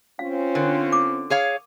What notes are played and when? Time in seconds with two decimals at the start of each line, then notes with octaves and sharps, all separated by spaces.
0.19 C4 C#4 F4 F5
0.55 D3 A#4
0.93 D6
1.30 G#4 C#5 F5